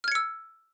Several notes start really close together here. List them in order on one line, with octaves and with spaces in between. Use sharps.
F6 G#6 C#7 E6